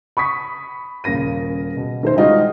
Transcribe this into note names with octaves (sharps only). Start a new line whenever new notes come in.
B5 C#6 D#6 B6
D#1 C#3 A#3 A#6 D#7
B2
D#3 A3 C5
G3 G#3 D#4 F4 F#4